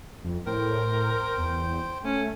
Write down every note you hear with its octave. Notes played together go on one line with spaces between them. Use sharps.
F2
A2 A#4 C5 G5
E2
A3 C#4